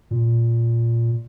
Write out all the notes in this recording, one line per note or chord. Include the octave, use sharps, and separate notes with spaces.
A#2